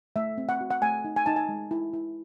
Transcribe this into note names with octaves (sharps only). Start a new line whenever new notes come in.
A3 E5
C4
F#5
F#4
F#5
A3 G#5
D#4
G#5
D#4 A5
G#5
G#3
E4
E4